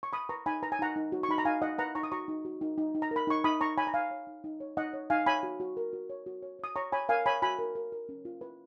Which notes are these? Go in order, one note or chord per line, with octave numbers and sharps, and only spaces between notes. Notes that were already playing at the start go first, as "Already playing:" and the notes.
C#6
B4 B5 D#6
B4 A#5 C#6
D#4 G#5 B5
B4 A#5
G#5
D#4 F#5 A#5
D#4
F#4
C#6
D#4 B5
A#5
D#4 F5 G#5
D#4 D#5 F#5
B4 F#5 A#5
D#4 A#5 C#6
D#6
F#4 A#5 C#6
D#4
F#4
D#4
D#4
D#4
A#5
A#4 B5
D#4 C#6
D#4 B5 D#6
D#4 A#5 C#6
C#5 G#5 B5
A#5
D#4 F5 G#5
C#5
D#4
D#4
C#5
D#4 D#5 F#5
C#5
D#4 F5 G#5
C#5 G#5 B5
F#4
F#4
A#4
F#4
C#5
F#4
C#5
C#5 D#6
C#5 A#5 C#6
C#5 G#5 B5
A#4 F5 G#5
C#5 G#5 B5
F#4 G#5 B5
A#4
A#4
A#4
C#4
F4
B4